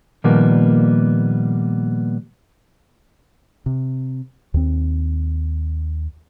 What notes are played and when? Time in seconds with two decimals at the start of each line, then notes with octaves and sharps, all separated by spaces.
0.24 A#2 D#3 F3 G3 A#3 B3
3.66 C3
4.54 D#2 C4